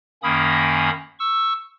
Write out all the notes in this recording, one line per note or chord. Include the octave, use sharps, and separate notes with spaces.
F#2 D#3 A#3 C#4 B5 D#6
C#6 E6